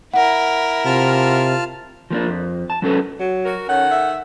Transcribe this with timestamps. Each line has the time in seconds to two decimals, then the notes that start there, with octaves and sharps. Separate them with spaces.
0.14 E4 A#4 F#5
0.86 C3 F4 A5 F6
2.10 F3 A#3 C4 D4
2.28 F2
2.70 A5
2.82 F#3 C#4 A4 B4
3.20 F#3
3.45 F#4 A#4
3.69 D#3 C#4 A4 F#5
3.91 E5